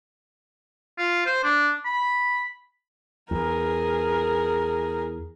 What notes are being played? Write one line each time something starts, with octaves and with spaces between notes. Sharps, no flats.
F4
C5
D4
B5
E2 G#4 A#4